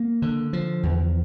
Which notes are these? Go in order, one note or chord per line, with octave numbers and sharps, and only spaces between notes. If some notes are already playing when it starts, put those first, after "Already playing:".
Already playing: A#3
D3
F3
E2